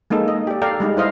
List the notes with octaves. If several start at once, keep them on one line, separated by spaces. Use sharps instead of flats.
G#3 A#3 D#4 A4
D#5
G4 D5
A4 D5 F5 G5 A#5
G3 G#3 D#4
E4 C5 D#5 F5